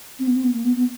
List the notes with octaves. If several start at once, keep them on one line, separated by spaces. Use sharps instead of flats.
C4
B3
C4
B3
A#3
B3
B3